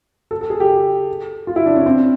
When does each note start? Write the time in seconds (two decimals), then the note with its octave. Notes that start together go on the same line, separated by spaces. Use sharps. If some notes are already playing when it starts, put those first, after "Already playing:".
0.31 A4
0.41 A4
0.50 G#4
0.60 G4
1.47 F4
1.56 E4
1.66 D4
1.76 C#4
1.86 C4